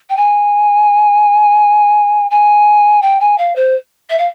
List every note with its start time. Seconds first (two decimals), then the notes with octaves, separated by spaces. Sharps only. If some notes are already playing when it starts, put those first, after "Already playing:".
0.09 G5
0.17 G#5
2.31 G#5
3.02 G5
3.20 G#5
3.38 F5
3.56 C5
4.10 E5
4.18 F5